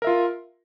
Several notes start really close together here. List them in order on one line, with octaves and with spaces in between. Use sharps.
A#4 E5 F4